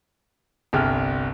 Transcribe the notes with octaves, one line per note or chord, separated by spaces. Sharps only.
G1 C2 G5 F6